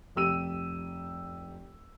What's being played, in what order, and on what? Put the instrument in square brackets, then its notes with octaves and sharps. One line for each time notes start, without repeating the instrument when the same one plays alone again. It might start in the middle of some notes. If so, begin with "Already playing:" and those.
[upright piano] F1 G4 E6 D#7